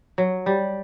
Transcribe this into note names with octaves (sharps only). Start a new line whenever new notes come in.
F#3
G3